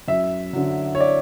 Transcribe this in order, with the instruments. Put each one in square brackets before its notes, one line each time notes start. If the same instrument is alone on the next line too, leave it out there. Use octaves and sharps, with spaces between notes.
[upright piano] F#2 E5
D3 F#3
C#5
D5